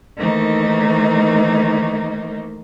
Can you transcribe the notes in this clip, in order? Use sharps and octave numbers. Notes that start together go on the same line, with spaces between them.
D#3 E3 A3 A#3 D#4 C5